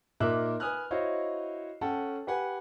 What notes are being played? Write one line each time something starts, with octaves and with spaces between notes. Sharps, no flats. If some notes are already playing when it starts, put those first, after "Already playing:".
A#2 D#4 A#4 E5 D6 F#6
B4 G#5 D#6 F6 F#6
E4 F#4 C5 C#5 D#5 F5
C#4 A4 F#5 G5 A5
G4 B4 F#5 G#5